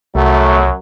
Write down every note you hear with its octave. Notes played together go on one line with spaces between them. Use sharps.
C2 F#2 F#3 A3